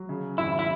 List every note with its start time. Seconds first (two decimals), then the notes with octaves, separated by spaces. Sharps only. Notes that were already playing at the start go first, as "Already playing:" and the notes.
Already playing: F#3
0.09 C#3
0.38 G#1 E4
0.59 E4